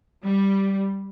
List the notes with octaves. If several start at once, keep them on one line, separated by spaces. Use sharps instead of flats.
G3